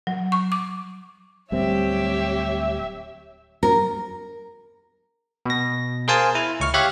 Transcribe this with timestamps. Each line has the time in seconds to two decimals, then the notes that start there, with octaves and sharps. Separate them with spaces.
0.07 F#3
0.32 C#6
0.52 D6
1.52 D1 G3 C4 G4 C#5 E5
3.63 A#4
5.46 B2 A#6
6.08 G#4 A#4 C5 F5 G#5 A5
6.35 E4
6.60 C#2 C#6 F6
6.74 G4 C#5 E5 F5 F#6